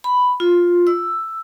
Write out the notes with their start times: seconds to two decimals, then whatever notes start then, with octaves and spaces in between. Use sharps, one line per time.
0.04 B5
0.40 F4
0.87 E6